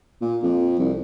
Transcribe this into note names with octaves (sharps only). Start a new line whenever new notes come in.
A#2
F2
C2